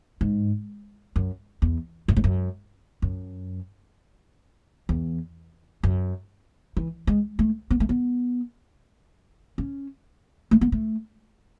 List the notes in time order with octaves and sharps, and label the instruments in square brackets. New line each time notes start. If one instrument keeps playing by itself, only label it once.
[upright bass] G#2
F#2
E2
F#2
G#2
F#2
F#2
E2
F#2
E3
G#3
A3
B3
A3
B3
C#4
A3
B3
A3